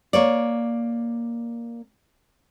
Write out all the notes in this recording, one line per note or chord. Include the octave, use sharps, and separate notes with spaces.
A#3 C#5 D5